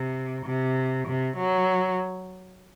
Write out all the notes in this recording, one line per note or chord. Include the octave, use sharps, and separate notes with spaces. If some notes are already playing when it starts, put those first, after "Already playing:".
Already playing: C3
C3
C3
F#3